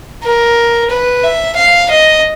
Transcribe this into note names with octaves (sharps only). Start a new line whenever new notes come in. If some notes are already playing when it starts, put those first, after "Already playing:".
A#4
B4
E5
F5
D#5